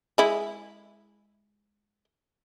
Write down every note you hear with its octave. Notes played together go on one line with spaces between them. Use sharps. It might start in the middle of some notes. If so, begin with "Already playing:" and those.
G#3 E4